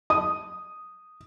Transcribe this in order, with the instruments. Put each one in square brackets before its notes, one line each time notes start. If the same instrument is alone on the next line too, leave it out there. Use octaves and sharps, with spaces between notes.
[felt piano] D#6